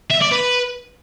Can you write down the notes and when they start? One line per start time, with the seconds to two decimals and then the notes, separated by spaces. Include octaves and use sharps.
0.11 E5
0.22 D5
0.32 B4